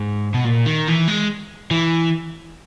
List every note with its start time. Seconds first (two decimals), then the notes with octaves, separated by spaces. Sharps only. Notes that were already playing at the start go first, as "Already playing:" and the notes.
Already playing: G#2
0.34 B2
0.45 A#2
0.66 D#3
0.87 E3
1.08 G#3
1.71 E3